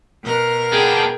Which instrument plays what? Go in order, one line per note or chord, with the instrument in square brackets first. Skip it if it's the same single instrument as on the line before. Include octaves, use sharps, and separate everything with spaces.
[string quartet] B2 A#4 F6
[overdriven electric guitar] B3 D4 [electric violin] G#4 G5